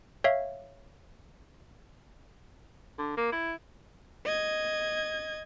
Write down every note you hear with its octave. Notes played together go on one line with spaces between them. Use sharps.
C#5 E5 F5
D3
A#3
E4
D#5 G#6